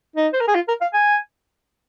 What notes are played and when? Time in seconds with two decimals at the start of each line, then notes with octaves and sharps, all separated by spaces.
0.16 D#4
0.33 C5
0.41 A#4
0.48 G#4
0.55 F4
0.68 A#4
0.81 F5
0.94 G#5